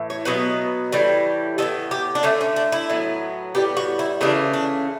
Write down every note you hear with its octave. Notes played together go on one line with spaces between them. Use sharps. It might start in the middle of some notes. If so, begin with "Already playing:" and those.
Already playing: A2 E3
C#5
B2 F#3 B3 B4
A2 E3 G3
A2 F#3 B3 A4
G4
D4
D3 A3 C#4
C#4
D4
E4
A2 F#3 B3
A2 G3 B3 G4
F#4
E4
C#3 E3 A3 D4
D4